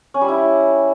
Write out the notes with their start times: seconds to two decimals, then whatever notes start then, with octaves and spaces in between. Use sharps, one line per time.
0.14 C#4
0.21 G3
0.28 E4